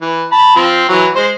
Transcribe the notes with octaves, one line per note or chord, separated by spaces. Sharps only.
E3
A5 B5
F3 C4
E3 F#3
G#3 C5